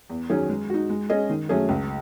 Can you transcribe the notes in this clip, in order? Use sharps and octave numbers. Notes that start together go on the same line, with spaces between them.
E2
D#3 F#3 C#4 G#4
G#3
D#4 F#4
G#3
C#4 G#4 D#5
D#3
F#3 A3 C#4 G#4
C#2